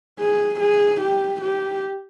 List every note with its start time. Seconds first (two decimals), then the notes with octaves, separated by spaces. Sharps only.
0.20 G#4
0.60 G#4
1.01 G4
1.42 G4